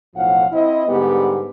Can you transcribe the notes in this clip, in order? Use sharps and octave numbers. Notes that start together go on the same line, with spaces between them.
B1 A2 F3 F5 F#5
C4 E4 D#5
G#2 D3 G3 B3 G4